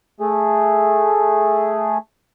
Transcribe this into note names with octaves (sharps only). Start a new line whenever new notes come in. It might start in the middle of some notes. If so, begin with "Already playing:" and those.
A3 G#4